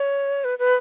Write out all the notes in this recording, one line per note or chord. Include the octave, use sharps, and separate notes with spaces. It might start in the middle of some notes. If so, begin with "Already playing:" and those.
Already playing: C#5
B4
B4